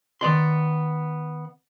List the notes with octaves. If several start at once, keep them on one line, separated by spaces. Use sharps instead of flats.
D#3 B3 D5 C6